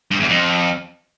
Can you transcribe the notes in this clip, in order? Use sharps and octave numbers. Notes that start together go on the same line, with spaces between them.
G2
E2
F2